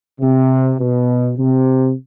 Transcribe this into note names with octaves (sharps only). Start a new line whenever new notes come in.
C3
B2
C3